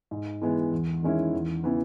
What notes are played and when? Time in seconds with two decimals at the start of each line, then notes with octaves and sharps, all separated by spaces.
0.11 G#2
0.42 E3 G#3 B3
0.71 E2
1.03 D#3 G#3 C#4 E4
1.33 E2
1.64 C#3 E3 B3